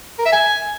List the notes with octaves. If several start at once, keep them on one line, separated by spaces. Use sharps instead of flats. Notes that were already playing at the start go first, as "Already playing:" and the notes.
A#4
E5
G#5